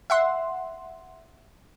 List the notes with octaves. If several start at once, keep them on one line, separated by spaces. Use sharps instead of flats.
E5 F#5 C6